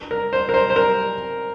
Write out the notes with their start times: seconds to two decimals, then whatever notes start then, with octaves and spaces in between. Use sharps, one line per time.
0.11 A#4
0.33 C5
0.49 A#4
0.54 C5
0.70 C5
0.76 A#4